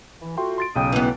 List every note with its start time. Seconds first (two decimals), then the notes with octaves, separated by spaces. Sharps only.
0.22 E3
0.37 A3 F4 F#4 G5 C6
0.58 C6 A6 D7
0.76 B1 C#3 G#3 C#4 G5 D#6
0.92 E3 B3